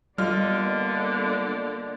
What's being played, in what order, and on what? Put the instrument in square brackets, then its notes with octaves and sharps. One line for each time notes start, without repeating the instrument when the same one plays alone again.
[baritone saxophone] D3 [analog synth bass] G3 [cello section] A#3 B3 D5 [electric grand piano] F4 D#5 F6